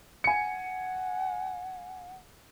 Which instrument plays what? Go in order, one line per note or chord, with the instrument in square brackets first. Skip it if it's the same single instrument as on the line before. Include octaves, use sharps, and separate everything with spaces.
[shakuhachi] F#5 [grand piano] G#5 C#7